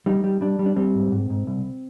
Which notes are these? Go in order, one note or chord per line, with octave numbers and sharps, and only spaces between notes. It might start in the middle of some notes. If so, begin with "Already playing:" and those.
G3 D#4
G3
G3 D4
G3
D4
G3 C4
G#2
G#2
G#2
C2